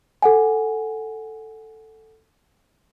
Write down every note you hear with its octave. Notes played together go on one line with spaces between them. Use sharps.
A4 F#5 G#5